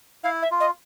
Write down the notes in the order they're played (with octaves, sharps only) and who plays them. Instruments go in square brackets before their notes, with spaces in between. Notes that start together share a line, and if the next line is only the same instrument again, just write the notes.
[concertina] E4 [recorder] F5
[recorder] E5
[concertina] F4
[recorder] D#5